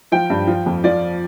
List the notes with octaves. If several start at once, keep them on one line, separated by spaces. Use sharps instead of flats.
F3 G5
G2
F3
F2
F3 D5